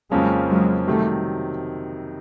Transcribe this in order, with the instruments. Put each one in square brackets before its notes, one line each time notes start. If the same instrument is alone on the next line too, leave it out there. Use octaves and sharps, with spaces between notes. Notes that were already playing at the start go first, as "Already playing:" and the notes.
[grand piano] F2 C#3 F3 A#3 C#4 [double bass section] F#3 G#3
[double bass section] F#3 G#3
[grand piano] C3 D#3 F#3 [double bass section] G3 A3